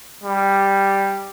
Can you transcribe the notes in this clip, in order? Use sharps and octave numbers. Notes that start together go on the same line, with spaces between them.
G3